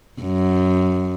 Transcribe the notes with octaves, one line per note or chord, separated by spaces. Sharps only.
F#2